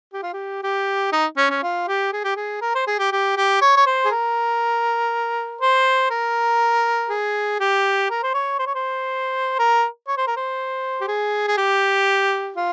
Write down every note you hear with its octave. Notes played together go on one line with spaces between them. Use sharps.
G4
F4
G4
G4
D#4
C#4
C#4
F4
G4
G#4
G4
G#4
A#4
C5
G#4
G4
G4
G4
C#5
C#5
C5
G#4
A#4
C5
A#4
G#4
G4
A#4
C5
C#5
C5
C#5
C5
A#4
C#5
C5
A#4
C5
G4
G#4
G#4
G4
F4